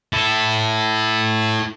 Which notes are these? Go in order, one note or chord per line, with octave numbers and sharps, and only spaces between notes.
E4 A4